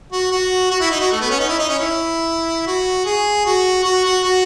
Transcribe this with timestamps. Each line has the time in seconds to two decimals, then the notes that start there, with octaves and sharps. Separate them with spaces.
0.12 F#4
0.32 F#4
0.71 F#4
0.80 E4
0.91 D#4
1.00 F#4
1.12 A3
1.21 B3
1.30 C#4
1.39 D#4
1.49 E4
1.59 D#4
1.68 C#4
1.79 E4
2.67 F#4
3.05 G#4
3.45 F#4
3.84 F#4
4.04 F#4
4.24 F#4